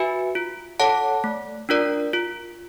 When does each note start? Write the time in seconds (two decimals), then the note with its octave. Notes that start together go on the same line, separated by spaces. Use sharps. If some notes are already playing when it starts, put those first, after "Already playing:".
Already playing: F#4 B4 E5 G#5
0.35 F4
0.80 A4 C#5 F#5 A5
1.24 A3
1.69 D4 F4 A#4 D5
2.13 F4